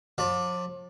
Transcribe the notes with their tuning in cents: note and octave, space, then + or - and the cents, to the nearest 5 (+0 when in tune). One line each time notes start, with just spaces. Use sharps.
F3 +45 D5 +0